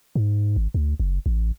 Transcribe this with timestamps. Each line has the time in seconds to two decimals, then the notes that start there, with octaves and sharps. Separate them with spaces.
0.15 G#2
0.56 G#1
0.74 D2
1.00 F#1
1.26 A1